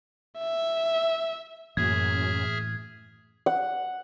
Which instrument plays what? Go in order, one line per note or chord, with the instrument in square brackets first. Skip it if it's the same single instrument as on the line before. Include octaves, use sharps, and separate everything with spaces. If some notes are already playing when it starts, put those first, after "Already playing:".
[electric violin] E5
[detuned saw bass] F#2 [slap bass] A2 E3 A#3 [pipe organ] G#4 E5 F6 [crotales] G#6
[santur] F#5